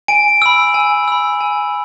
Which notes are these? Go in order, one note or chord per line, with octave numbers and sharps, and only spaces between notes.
G#5 D7
B5 E6
G#5
B5 E6
G#5